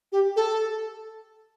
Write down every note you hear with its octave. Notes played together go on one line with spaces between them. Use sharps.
G4
A4